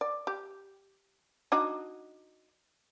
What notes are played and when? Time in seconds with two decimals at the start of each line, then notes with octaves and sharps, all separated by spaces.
0.01 D5
0.27 G4
1.52 D4 D#4 F#4